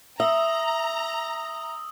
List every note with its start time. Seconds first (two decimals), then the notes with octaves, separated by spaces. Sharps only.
0.20 E5 A#5 D#6 E6